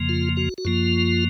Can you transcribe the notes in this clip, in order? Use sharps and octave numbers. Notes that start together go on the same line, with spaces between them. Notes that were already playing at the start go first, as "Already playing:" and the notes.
Already playing: F2 C#3 F3 A#3
F4
F#4
F#4
F#2 F3 A#3 F4